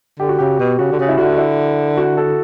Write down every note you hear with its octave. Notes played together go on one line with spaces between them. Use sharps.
D3 G4
F#4
C#3 G4
B2
C#3 F#4
D3
C#3
E4
D3 F#4
E4
E4
F#4
A4